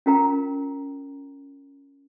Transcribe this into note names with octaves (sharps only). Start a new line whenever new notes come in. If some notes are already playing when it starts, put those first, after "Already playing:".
C#4 F4 A#4 G5 A#5